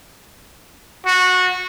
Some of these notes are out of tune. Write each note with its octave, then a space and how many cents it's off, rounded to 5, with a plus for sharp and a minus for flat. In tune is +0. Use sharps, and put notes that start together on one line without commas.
F#4 -20